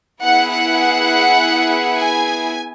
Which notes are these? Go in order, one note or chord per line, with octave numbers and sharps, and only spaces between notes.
B3 E4 G#4 F#5
F#5
G#5